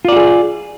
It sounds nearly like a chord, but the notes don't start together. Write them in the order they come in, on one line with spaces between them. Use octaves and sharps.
F4 D5 F#4 G#4